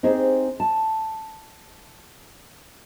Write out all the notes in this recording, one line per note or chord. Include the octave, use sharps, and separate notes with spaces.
C4 D#4 G4 G#4 C5
A5